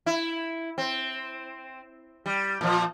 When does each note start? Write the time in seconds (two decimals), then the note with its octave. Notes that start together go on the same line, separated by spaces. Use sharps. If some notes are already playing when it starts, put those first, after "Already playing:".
0.06 E4
0.78 C4
2.26 G3
2.61 A#2 F3